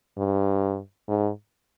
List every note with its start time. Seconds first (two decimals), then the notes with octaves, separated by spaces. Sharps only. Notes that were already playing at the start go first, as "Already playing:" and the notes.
0.17 G2
1.08 G#2